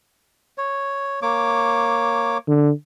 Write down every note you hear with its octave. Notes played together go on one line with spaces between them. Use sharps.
C#5
A#3 C#5 D6
D3